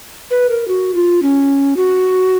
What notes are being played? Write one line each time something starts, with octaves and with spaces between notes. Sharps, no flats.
B4
A#4
F#4
F4
C#4
F#4